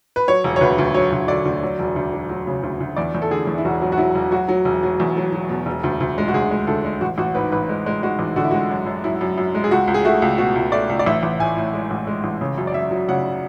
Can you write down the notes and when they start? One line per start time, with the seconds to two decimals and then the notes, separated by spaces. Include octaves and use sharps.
0.16 B4
0.28 F#3 C#5
0.44 E1
0.56 C#5
0.61 D2 B4
0.78 D2
0.94 F#3 C#5
1.12 D2
1.28 D3 D5
1.45 D2
1.63 F#3
1.79 E1
1.96 D2
2.13 F#3
2.29 F#3
2.47 C#3
2.63 D2
2.80 D2
2.96 E2 D5
3.15 E2
3.22 A4
3.31 D3 G#4
3.47 E2
3.58 E4
3.65 E1 F#4
3.82 F#3
3.92 F#4
3.98 F#3 E4
4.15 E1
4.31 F#3 F#4
4.49 F#3
4.65 E1
4.83 F#3
5.00 E2
5.17 F#3
5.33 F#3
5.49 B2
5.66 E1
5.84 D2
6.00 D2
6.18 G#3
6.28 F#4
6.33 D2 G#4
6.51 G#3
6.67 D2 A4
6.85 G#3
7.01 A1 F#4
7.18 A1 F#4
7.35 G#2 B4
7.52 A1 B4
7.69 G#3
7.86 G#3
8.03 G#3 F#4
8.19 A1
8.36 D3 F#4
8.44 E4
8.51 G#3 F#4
8.70 F#2
8.86 F#2
9.04 F#2 E4
9.21 F#2
9.38 F#2
9.55 G#3
9.64 G#4
9.71 C#2 F#4
9.87 C#2
9.94 G#4
10.05 A3 F#4
10.22 C#2
10.38 B2 F#4
10.55 C#2
10.72 A3 D5
10.89 C#2
10.99 D5
11.06 A1 E5
11.23 A1
11.39 A2 G#5
11.57 A2
11.73 G#3
11.91 A1
12.07 G#3
12.24 A1
12.41 C#3
12.58 F#2
12.67 D5
12.74 F#2 E5
12.91 F#3
13.08 C#3 F#5